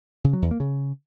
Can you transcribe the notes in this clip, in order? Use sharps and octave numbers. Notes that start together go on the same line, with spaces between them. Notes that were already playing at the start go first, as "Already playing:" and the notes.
C#3
F#3
E2
A#3
C#3